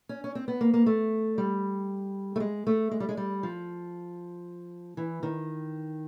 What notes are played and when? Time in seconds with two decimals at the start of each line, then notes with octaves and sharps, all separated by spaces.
0.09 C#4
0.24 C#4
0.35 C4
0.48 B3
0.61 A#3
0.74 A#3
0.86 A3
1.38 G3
2.36 A3
2.40 G#3
2.67 A3
2.91 G#3
3.00 G3
3.09 G#3
3.17 G3
3.43 F3
4.97 E3
5.23 D#3